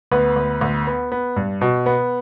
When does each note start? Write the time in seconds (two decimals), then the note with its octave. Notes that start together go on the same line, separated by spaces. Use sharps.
0.11 D2 B3 B4
0.36 D2
0.61 D2
0.87 B3
1.12 B3
1.36 G2
1.61 B2
1.86 B3